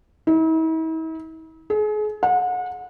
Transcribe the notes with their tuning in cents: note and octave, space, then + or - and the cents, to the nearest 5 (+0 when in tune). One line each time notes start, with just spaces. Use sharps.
E4 -45
G#4 +35
F#5 -35